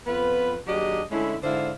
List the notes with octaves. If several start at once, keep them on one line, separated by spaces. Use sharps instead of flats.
F2 B3 F4 B4
D#2 F#3 D4 G4 G#4 D#5
D3 G#3 A3 C#4 E4
G#2 D3 E4 C5 D5 F5